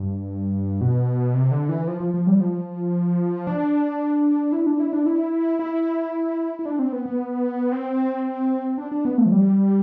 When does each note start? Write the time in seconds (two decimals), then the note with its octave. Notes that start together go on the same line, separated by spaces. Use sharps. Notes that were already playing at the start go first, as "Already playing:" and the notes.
Already playing: G2
0.81 B2
1.34 C3
1.51 D3
1.69 E3
1.88 F3
2.00 F3
2.14 F3
2.27 G3
2.41 F3
3.47 D4
4.52 E4
4.67 D4
4.80 E4
4.93 D4
5.06 E4
5.59 E4
6.59 E4
6.66 D4
6.79 C4
6.92 B3
7.06 B3
7.72 C4
8.78 D4
8.92 D4
9.05 B3
9.18 A3
9.26 F3
9.32 G3